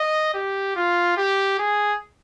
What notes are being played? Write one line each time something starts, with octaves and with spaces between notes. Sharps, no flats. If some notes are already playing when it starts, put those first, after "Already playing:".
Already playing: D#5
G4
F4
G4
G#4